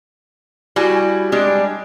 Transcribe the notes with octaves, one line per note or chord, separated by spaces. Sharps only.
G3 E4 F#4 G#5
G3 G#3 D4